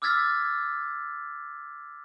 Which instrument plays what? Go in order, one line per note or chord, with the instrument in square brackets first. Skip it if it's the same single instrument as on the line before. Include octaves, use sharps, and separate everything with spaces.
[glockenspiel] D6 E6 F6 G#6 A6 B6